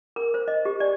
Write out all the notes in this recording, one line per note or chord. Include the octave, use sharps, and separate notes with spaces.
A#4
C5
D#5
G4
D5